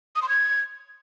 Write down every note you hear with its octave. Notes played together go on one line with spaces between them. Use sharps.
D#6
C6
G#6